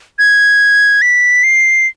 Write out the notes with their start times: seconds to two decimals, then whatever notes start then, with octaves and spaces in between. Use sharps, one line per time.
0.19 G#6
1.02 B6
1.43 C7